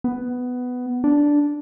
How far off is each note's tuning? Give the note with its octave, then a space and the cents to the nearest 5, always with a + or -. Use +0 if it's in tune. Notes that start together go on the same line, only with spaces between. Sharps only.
B3 +10
D4 -5